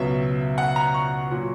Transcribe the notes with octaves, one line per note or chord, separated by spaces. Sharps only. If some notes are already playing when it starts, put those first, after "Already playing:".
Already playing: C#2 B2 F#3 E5
F#5
A#5
C#6
A#2 F#3